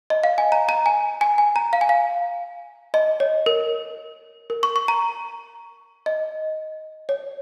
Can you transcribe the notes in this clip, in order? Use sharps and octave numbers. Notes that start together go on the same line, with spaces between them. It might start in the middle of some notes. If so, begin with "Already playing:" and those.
D#5
F5
G#5
A#5
A#5
G#5
G#5
G#5
A#5
F5
G#5
F5
D#5
C#5
A#4
A#4
C#6
C#6
A#5
D#5
C#5